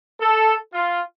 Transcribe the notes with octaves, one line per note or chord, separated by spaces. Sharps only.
A4
F4